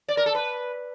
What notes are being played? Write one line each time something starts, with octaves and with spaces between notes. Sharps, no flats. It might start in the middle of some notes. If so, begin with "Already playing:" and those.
D5
A#4
A4
B4